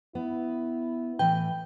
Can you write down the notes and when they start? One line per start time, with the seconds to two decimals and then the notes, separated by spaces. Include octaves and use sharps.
0.15 B3 E4
1.19 A2 E3 B4 G5